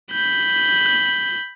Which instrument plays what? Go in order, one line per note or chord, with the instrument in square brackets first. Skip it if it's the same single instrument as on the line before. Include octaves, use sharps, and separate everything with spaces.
[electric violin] B5 G6